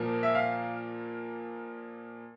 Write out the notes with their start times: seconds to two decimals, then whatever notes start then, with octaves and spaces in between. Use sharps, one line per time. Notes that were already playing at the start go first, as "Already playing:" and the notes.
Already playing: A#2 F3 A#3
0.23 E5
0.35 F5